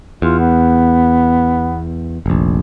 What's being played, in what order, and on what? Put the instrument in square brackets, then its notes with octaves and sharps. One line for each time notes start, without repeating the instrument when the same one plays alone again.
[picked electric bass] E2 [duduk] F4
[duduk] B3
[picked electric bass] F1 A#1